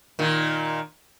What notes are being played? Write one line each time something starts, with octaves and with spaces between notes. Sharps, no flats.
A#2 D#3